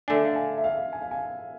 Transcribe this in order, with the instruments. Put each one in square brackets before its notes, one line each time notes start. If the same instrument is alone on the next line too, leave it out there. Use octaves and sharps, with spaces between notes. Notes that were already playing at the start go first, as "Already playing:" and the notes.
[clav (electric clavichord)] D3 A3 D4 [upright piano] G#5
[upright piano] F5
G#5
E5
F5
G#5
F5
G#5